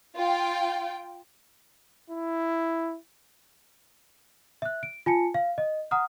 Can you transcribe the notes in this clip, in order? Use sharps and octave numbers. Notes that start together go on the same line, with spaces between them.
F4 G5
E4
E5 F#6
D7
F4 G#5 A5 C#7
F5
D#5
F#5 A#5 D#6 F6